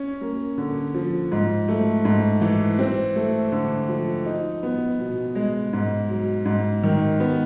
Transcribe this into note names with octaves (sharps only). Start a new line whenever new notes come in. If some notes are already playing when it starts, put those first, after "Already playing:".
Already playing: C#4
A#3
D3
F3
G#2
A3
G#2
E3
C4
A3
D3
F3
D#4
B3
B2
G#3
G#2
F#3
G#2
D#3
B3